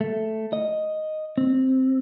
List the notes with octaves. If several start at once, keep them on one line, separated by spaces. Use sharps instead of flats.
A3
D#5
C4